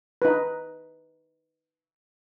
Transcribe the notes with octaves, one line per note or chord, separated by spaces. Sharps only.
D#4 B4